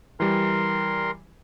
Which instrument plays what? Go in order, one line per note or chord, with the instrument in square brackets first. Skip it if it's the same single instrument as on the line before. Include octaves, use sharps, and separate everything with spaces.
[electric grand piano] E3 G3 [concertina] A#4 C6